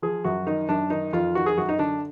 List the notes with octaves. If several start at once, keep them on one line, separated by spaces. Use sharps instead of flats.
F3 G#4
F#2 F#4
D#3 D#4
F#2 D4
D#3 D#4
F2 F4
D#3 F#4
G#4
F#2 F#4
D#4
D3 D4